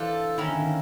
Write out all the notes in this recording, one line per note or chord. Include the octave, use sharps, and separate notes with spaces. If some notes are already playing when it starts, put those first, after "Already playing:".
Already playing: E3 D4 F4 A4 C5
D#3 A#3 C#4 E4
D3
D#3